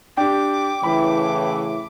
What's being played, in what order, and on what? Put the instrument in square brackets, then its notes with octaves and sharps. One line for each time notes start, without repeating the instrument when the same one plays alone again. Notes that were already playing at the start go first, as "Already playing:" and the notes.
[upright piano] D4 G4 [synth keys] G5 [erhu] D6
[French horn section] A2 C#3 E3 [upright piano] B5